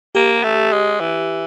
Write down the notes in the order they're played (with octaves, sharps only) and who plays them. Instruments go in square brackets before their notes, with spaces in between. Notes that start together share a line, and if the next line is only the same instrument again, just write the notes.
[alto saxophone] A#3 [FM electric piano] G4
[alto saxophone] A3
G#3
E3